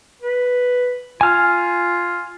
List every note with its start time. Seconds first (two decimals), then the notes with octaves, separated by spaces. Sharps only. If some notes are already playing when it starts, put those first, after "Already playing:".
0.22 B4
1.21 F4 G#5 F6